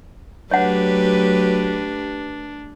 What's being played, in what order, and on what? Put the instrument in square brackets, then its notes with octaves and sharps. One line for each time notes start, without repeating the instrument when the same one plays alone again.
[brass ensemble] F#3 [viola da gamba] A3 G4 B4 [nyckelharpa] D4 [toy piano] C#5 F#5